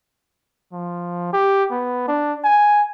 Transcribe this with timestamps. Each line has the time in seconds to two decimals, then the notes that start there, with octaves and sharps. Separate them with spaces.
0.73 F3
1.33 G4
1.71 B3
2.08 D4
2.44 G#5